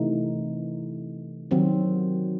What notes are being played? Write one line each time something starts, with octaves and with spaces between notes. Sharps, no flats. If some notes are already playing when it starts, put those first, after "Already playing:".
Already playing: C3 E3 A3 D#4
D#3 F#3 C4 F#4